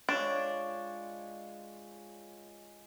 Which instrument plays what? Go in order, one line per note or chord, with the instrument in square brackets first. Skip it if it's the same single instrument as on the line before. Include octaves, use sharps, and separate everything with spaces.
[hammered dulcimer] G#3 F4 C#5 [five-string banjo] D4